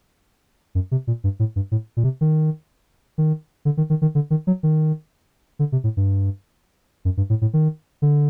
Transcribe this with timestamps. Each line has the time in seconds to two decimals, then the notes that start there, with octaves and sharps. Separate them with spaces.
0.75 F#2
0.91 C3
1.07 A#2
1.24 G2
1.39 A2
1.56 G2
1.71 A2
1.97 A#2
2.04 C3
2.21 D#3
3.18 D#3
3.65 D3
3.77 D#3
3.90 D#3
4.02 D#3
4.15 D3
4.30 D#3
4.47 F#3
4.63 D#3
5.59 D3
5.72 C3
5.84 A2
5.97 G2
7.05 F#2
7.17 G2
7.30 A2
7.41 A2
7.53 D#3
8.02 D3